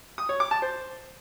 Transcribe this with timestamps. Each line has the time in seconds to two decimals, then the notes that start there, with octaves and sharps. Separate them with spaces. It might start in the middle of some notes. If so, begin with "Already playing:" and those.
0.18 D#6
0.29 C#5
0.40 D6
0.51 A5
0.62 C5